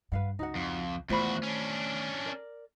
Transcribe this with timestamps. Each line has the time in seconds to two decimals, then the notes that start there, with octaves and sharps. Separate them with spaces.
0.12 G2 B4 F5 F#5
0.39 C#2 D#4 F#4 F#5
0.55 F2
1.09 E2 D#3 A3 F4 F#4 C5 B5
1.43 C#4 D4
2.25 A#4 D5